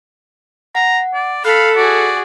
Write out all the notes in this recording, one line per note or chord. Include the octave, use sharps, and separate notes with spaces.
F#5 A#5
D5
A4 F5 B5 F#6 B6
F#4 G#4 D5